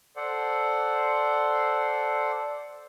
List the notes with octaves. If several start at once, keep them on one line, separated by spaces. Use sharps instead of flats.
A4 C5 D5 F#5